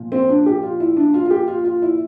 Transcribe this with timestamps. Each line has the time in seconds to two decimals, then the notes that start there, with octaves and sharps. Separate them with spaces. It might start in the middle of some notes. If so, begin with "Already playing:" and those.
Already playing: A#2 F3
0.12 C4
0.29 D4
0.46 G4
0.63 F4
0.80 E4
0.97 D4
1.14 F4
1.25 F4
1.31 G4
1.48 F4
1.64 F4
1.82 E4